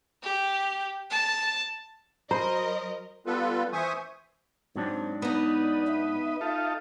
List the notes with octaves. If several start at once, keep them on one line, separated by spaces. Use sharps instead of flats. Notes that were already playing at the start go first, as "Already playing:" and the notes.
G4
A5
F#3 A#4 C5 D#5 A#5 B5
G3 B3 F4 A4 B4
E3 C5 E5 G#5 C#6 D#6
G#2 F#3 C4 D4
B3 D#4 B4 D5 D#5
E5
D#4 F4 A4